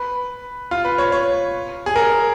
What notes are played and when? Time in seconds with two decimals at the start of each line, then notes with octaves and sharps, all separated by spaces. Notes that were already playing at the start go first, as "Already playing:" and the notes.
Already playing: B4
0.71 F4
0.85 B4
0.98 C#5
1.12 C#5
1.86 G#4
1.96 A#4